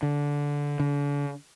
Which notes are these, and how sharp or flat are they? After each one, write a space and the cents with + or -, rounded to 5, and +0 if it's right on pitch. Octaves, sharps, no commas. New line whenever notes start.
D3 -15
D3 -40